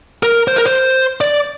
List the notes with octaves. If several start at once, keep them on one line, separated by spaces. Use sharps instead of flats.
A#4
C5
A#4
C5
D5